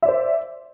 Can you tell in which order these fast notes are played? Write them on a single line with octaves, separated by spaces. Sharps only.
E5 D5 C5